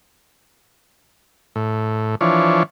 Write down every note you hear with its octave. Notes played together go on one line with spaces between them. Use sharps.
A2
E3 F3 D4 C#5